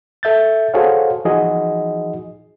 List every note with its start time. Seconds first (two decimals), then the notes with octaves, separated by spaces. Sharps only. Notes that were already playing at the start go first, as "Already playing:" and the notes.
0.23 A4 E5 G6 A6
0.74 F#4 G#4 A4 C5 C#5 F5
1.25 E3 F3 D#4 F#4 G#4 D#5